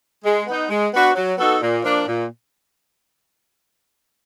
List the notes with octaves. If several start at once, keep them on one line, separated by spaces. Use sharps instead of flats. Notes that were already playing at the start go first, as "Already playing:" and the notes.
G#3
B3 D#4
G#3
B3 D4 F#4 B4
F#3
B3 D#4 F#4 A4
A#2
F3 A#3 D4
A#2